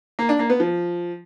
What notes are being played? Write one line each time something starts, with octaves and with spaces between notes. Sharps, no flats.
A#3
D4
A#3
B3
F3